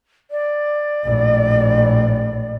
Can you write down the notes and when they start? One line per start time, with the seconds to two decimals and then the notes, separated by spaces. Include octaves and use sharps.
0.31 D5
1.04 A#1 A2